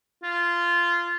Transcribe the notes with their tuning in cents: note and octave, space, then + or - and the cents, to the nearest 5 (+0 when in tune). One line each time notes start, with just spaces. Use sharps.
F4 -15